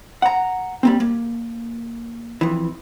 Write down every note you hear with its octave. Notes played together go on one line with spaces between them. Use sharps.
F#5 A#5
G3 A#3 C4
A#3
F2 E3